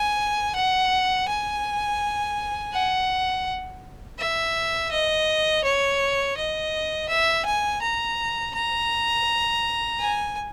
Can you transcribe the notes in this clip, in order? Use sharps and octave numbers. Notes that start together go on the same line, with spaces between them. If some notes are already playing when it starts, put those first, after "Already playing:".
Already playing: G#5
F#5
G#5
F#5
E5
D#5
C#5
D#5
E5
G#5
A#5
A#5
G#5